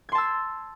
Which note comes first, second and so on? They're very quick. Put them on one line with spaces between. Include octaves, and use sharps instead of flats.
G#6 C6 A5 E6